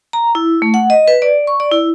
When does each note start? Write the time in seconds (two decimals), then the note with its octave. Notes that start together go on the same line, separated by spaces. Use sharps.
0.13 A#5
0.35 E4
0.62 A3
0.74 F#5
0.90 D#5
1.08 B4
1.22 D5
1.47 C#6
1.60 D5
1.72 E4